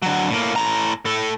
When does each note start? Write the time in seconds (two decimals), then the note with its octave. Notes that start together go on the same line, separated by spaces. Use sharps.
0.02 D3 F#3
0.30 A2 A#3
0.56 A2 A#5
1.05 A2 A4